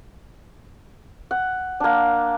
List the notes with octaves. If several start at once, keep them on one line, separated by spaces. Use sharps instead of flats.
F#5
A#3 D4